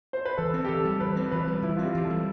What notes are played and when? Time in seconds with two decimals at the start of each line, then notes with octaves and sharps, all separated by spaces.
0.13 C5
0.25 B4
0.37 E3 A4
0.54 C4
0.64 G4
0.69 E3 A4
0.85 G3
1.00 E3 B4
1.16 C4
1.31 E3 B4
1.47 G3
1.63 E3 E4
1.76 F4
1.79 C4 G4
1.95 E3
2.05 A4
2.10 G3